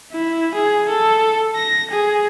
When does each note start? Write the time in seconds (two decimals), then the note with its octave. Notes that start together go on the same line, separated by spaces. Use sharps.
0.12 E4
0.55 G#4
0.89 A4
1.55 A#6
1.91 G#4